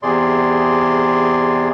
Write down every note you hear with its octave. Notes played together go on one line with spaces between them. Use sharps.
E2 C3 G#4 D5 C6